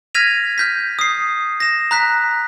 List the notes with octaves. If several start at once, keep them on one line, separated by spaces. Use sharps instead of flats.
F6 G#6 A#6 B6 D#7 F7
F6 G6 B6
D#6 C7
A#6 E7
A#5 F#6 B6